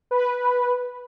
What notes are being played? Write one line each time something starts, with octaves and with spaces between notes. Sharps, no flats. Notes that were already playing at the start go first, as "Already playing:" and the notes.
B4